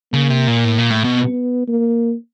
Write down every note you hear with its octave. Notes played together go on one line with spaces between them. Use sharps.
C#3 A#3
C3
A#2
A2
A#2
A2
B2
B3
A#3